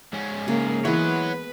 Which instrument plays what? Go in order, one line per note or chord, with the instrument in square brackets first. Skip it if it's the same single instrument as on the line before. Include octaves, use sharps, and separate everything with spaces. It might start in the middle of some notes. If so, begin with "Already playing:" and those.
[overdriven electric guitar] G#2 C#4
[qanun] C#3 [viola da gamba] A#3
[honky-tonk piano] E3 [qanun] G#3 B3 [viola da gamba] B4 [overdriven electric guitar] C#5 F#5